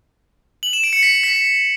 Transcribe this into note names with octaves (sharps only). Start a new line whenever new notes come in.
F#7
E7
D7
C#7
B6
B6